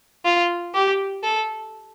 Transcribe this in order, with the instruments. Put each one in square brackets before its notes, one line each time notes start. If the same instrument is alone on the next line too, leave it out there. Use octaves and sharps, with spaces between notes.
[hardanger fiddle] F4
G4
A4